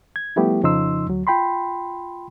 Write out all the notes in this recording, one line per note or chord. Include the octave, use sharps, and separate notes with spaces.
G#6
F3 G3 A3 B3 E4 G4
F2 C#3 F3 D#4 C6 E6
D2 F#3
F4 G5 B5 C6